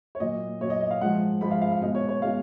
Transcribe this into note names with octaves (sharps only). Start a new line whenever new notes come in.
C#5
A#2 F#3 D#5
A#2 F#3 C#5
D#5
D#5
F5
G#2 F3 G#3 F#5
G#2 F3 G#3 B5
F5
F5
F5
B2 G#3 D#5
C#5
C#5
B2 G#3 F5